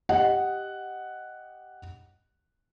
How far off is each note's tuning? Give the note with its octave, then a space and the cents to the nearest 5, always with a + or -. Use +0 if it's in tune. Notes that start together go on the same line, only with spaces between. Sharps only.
G4 +0 D#5 +0 F#5 +0